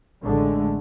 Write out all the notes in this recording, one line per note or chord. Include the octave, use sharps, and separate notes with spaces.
A1 D3 G#3 A3